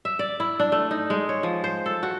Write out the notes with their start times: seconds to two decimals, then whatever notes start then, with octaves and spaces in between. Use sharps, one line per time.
0.05 E5
0.19 D5
0.40 E4
0.59 D4
0.72 A3
0.91 D#4
1.10 G#3
1.29 C#5
1.43 F3
1.64 C5
1.86 A4
2.03 F#4